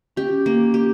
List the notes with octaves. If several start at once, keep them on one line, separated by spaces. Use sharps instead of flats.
C#4 G4
A#3
G4